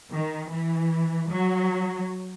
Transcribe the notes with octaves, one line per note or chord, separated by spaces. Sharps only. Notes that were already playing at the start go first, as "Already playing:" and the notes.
D#3
E3
F#3